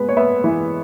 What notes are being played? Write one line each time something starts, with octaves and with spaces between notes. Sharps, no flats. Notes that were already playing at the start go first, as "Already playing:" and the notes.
Already playing: G#3 B3 B4
C#5
B3 E5
E3